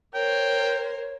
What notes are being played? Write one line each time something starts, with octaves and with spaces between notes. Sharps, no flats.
A#4 C5 C#5 G5